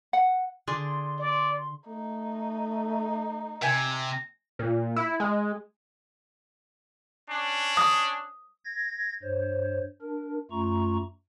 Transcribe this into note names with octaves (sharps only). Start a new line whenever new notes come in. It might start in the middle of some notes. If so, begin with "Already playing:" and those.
F#5
D3 D4 G#4 C6
D5
A3 D#4
C3 E5 G5 G#5
A#2
E4
G#3
C#4 D4
D#6
G#6 A#6
G2 C5 C#5
D4 A#4
F#2 A3 F4 A#5 C#6